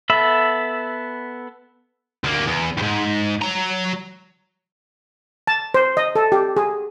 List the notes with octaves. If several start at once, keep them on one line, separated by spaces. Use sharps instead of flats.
B3 A4 E5 B5
D2 A#3
E2
D#2 G#2
F#3 A#5
A5
C5
D#5
A4
G4
G#4